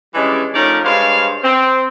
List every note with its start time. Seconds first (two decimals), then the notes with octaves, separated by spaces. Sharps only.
0.15 E3 G3 G#3 C#4 D4
0.55 F3 A3 C#4 D#4 A#4 D5
0.84 G2 G#3 C5 C#5 F5
1.42 C4